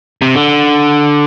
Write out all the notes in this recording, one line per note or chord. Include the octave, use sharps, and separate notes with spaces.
C3
D3